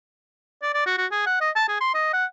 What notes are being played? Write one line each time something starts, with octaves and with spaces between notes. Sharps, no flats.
D5
D5
F#4
F#4
G#4
F#5
D#5
A5
G#4
C6
D#5
F#5